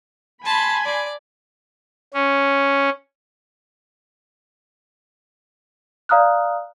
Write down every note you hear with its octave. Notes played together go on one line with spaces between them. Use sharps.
G#5 A5 B5 C6
D5
C#4
D5 F5 A#5 D#6 F6 F#6